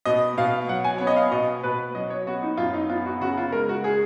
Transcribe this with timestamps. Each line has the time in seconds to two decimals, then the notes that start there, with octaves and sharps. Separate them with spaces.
0.05 B2 D#5
0.37 B2 F5
0.68 F#3 F#5
0.84 G#5
0.98 B3 C#5
1.07 D#5
1.16 F5
1.31 B2 D#5
1.63 B2 B4
1.95 F#3 D#5
2.10 C#5
2.27 B3 F#4
2.42 D#4
2.57 F#2 F4
2.73 D#4
2.89 B3 F4
3.06 F#4
3.21 C#3 F#4
3.37 F4
3.52 G#3 A#4
3.69 F#4
3.84 G#4